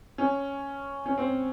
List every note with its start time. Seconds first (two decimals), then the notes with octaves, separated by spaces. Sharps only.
0.18 C#4
1.06 C#4
1.18 C4